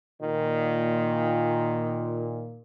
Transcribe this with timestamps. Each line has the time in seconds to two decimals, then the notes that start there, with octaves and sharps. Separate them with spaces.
0.22 A#2 D#3